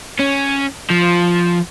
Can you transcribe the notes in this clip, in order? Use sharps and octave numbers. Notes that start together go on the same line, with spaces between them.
C#4
F3